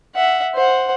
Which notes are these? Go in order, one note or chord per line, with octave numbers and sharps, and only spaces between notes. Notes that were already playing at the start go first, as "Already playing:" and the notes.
E5 F#5
C5 F#5